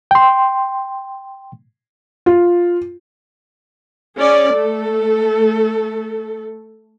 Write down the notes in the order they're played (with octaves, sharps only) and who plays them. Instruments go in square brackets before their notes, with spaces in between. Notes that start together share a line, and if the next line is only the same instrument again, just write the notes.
[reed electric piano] G5 C6
[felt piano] F4
[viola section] C#4 G#4 D5
A3 A4